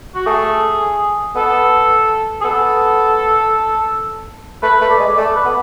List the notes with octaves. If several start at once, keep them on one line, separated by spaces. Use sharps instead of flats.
F#4
A3 G#4
B3 A4
G#4
B3 A4
A3 B4
A3
D5
G#3
A3 D5
B4
B3